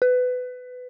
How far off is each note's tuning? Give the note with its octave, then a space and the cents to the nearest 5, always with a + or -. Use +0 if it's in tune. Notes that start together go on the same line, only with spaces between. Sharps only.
B4 +20